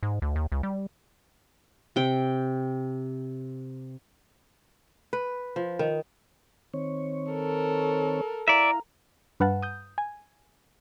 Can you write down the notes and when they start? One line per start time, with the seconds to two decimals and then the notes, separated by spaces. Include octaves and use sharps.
0.03 G#2
0.22 D2
0.36 D#2
0.52 C#2
0.63 G3
1.96 C3 G5
5.13 B4
5.56 F3
5.79 D#3
6.74 D#3 C4 C#5
7.32 A4 A#4
8.48 E4 D5 E5 F5 A#5
9.40 G2 B4 F5 F#5 A5
9.62 D#6 G6
9.98 G#5